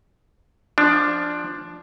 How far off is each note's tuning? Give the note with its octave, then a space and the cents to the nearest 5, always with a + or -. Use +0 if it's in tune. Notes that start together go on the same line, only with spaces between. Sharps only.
F3 +0 D4 +10